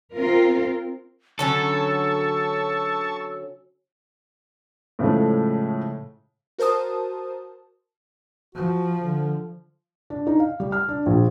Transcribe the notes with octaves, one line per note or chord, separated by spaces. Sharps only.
C4 F4 A#4
D3 F#3 C#4 A4 A5 C#6 E6
A2 C#3 F3 G#3 A3
F#4 A#4 C5 A5 D#6
F3 F#4
D3
D4
D#4
F5
G3
F6
D4
A#1